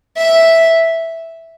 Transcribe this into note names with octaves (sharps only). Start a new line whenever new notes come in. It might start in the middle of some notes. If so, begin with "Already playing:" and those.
E5